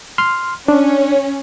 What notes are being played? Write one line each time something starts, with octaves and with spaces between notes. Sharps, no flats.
C6 F6
C#4 D4